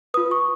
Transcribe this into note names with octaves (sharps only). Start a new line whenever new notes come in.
F4 B4 D#6
C#6